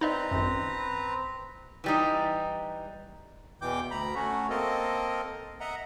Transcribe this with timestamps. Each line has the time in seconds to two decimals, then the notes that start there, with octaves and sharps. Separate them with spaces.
0.01 C4 D#4 B4 D5 D#5 A#5
0.31 G#1 F#2
1.84 E3 G3 D#4
3.62 E2 B2 E3 G5 D6 G6
3.91 D2 A#5 B5
4.15 A3 C#4 F#4
4.50 A#3 C4 A4 A#4 D#5
5.60 D#5 E5 F#5 A#5